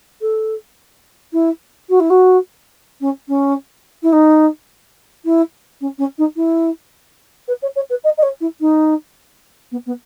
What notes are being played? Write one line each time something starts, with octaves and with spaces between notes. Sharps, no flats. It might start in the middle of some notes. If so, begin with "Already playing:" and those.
A4
E4
F#4
E4
F#4
C#4
C#4
E4
D#4
E4
C#4
C#4
D#4
E4
B4
C#5
C#5
B4
D#5
D#5
C#5
E4
D#4
B3
B3